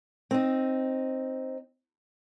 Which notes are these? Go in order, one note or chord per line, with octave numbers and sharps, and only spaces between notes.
C4 D#4